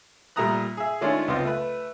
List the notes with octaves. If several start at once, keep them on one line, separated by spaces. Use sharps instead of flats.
A#2 G3 A3 A#5 D#6 F#6
G#4 E5
D#3 G#3 A3 C#4 D4 F4
C#2 B3 C4 F4 D#5
A3 B4